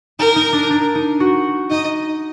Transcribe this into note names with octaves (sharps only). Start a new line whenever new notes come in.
D#4 A#4
D#4
D4
D4
D#4
F#4
D#4 D#5